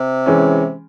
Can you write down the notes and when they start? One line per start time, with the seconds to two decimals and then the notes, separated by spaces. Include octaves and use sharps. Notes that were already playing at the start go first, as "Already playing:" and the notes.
Already playing: C3
0.26 E3 G#3 C#4